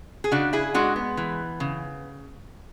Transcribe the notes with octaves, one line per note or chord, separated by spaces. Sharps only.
G#4
C#3 D4 F#4
E4 G#4
G#3 D4 F#4
B3
E3
C#3